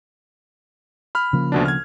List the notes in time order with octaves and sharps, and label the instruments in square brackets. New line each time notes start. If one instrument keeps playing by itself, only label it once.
[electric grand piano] B5 F6
[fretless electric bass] C#3 F3 A#3
[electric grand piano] D2 B2 D4
F6 G#6